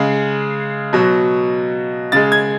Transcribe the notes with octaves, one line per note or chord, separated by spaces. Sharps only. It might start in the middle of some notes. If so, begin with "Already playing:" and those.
Already playing: C#3 G#3
B2 F#3
C#3 G#3 A6
G#6